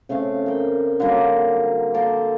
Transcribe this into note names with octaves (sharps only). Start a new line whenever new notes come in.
C#3 A3 C4 F5
A#4 G5
D3 F#3 G3 A#3
A#3 A4 C6 D6